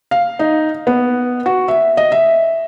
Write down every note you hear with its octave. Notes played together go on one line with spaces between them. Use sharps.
F5
D#4
B3
F#4
E5
D#5
E5